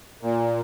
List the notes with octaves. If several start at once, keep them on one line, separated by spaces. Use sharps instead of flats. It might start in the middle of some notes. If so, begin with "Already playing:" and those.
A#2